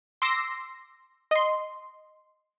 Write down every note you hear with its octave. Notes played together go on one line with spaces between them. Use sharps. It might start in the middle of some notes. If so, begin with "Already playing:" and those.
C6 D6 E6 A#6 C7
D#5 C6